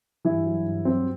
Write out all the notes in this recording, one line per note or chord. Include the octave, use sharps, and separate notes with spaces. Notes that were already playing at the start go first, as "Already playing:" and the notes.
G2 E3 E4
F#3
G2
F#3 C4